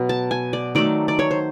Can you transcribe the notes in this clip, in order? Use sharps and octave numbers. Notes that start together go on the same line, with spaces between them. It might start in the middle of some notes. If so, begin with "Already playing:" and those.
Already playing: B2 F#3
A5
G#5
D5
D#3 F#3 A3 D5
D5
C#5
C5